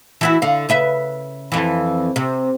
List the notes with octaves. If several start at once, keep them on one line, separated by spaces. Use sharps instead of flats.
E3 E4 F#4
D3 F5
C#3 B4 E5
F2 E3
C3